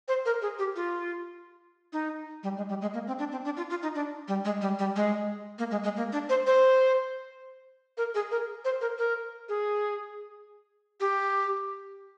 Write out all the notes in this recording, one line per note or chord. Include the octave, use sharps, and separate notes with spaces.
C5
A#4
G#4
G4
F4
D#4
G3
G#3
G3
G#3
A#3
C4
D4
C4
D4
F4
F4
D#4
D4
G3
G#3
G3
G3
G#3
A#3
G#3
G#3
A#3
D4
C5
C5
A#4
G#4
A#4
C5
A#4
A#4
G#4
G4